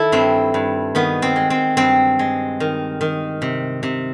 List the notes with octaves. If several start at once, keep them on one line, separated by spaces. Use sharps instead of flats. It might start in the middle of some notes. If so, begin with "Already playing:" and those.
Already playing: D#3 E4 A4
G2 C4
G2
D#3 B3
C4
G#3
C4
G2 C4
G#3
D#3
D#3
C3
C3